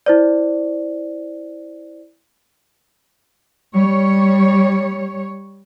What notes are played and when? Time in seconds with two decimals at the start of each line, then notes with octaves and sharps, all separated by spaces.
0.06 E4 C5 D5
3.74 G3 C#5